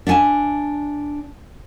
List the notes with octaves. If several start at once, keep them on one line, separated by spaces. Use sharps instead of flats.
D4 E5 F#5 G#5 A5